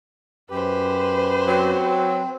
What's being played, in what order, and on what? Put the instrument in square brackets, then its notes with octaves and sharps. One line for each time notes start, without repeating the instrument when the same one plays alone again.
[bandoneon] F#2 G4 [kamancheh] B4 C5
[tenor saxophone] F#3 [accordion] C4